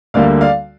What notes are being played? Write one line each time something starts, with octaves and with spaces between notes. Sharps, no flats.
D2 D3 G3 A#3 D5 F5
D5 F5